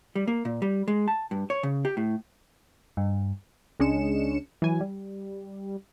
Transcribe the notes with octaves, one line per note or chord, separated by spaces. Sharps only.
G3
A#3
A#2
G3
G#3
A5
G2
C#5
C#3
G4
A2
G2
C#2 G#3 C#4 D4 C#7 E7
E3 F#3 G#5
G3